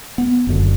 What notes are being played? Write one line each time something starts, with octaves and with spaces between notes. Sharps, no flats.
B3
F#1 F#2 D3